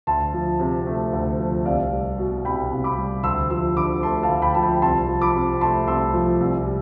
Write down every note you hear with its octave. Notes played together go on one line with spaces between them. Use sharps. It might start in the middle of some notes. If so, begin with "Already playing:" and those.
D2 A5 C6
F3
C3
A3
D2
F3
C2 D5 F5
G3
B2
C2 G5 B5
C2
B5 D6
G3
D2 C6 E6
F3 C6 E6
D3 B5 D6
A3 A5 C6
F5 A5
D2
G5 B5
F3 A5
G5 B5
C2 A5 C6
F3
B5 D6
C3
A3 A5 C6
C2 C6 E6
F3
C2
G3